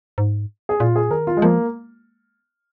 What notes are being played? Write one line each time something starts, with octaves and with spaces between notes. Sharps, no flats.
G#2
G#4
A#2 F4
G#4
D#3 A#4
F4
G#3
F3 A#3